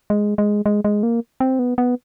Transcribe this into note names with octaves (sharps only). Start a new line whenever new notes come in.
G#3
G#3
G#3
G#3
A#3
C4
B3
B3